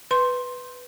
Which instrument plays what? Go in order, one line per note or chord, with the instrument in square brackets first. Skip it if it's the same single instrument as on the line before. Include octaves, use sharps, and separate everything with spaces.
[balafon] B4 C6